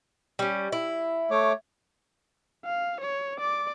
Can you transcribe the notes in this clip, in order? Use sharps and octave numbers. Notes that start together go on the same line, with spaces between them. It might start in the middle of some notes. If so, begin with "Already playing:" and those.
G3 C#4
E4
A3 C#5 D6
F5
C#5
D5 D6